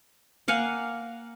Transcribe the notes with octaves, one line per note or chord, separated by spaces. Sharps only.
A#3 F5 F#5 G#5